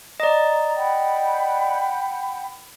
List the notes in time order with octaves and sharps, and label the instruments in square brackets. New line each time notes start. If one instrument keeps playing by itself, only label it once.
[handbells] D5 D#5 [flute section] A#5
[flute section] F#5 G5 B5